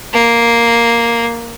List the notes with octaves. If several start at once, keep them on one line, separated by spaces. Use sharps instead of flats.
A#3